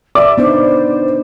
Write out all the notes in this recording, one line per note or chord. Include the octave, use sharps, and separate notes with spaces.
D5 E5 D6
B3 D4 D#4 C5